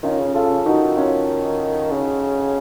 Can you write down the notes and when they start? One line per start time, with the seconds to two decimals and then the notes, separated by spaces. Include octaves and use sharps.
0.03 D#3 C#4 F4
0.19 C#3
0.34 C#3 F4 A4
0.50 C#3
0.65 D#3 D#4 F#4
0.97 C#4 F4
1.91 C#3